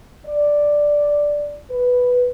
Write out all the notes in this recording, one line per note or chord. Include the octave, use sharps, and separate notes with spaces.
D5
B4